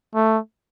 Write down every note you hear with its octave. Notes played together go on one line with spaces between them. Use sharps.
A3